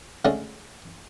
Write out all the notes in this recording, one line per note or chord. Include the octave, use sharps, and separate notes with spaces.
D3 G#3 A3 C#4